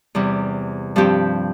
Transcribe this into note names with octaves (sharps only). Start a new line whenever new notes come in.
E2 C3 G3
G2 F3 C4 G4